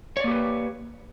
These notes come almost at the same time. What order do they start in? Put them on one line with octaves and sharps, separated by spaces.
C#5 D5 A#3 G4 B4